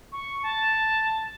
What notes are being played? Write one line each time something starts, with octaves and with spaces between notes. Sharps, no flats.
C#6
A5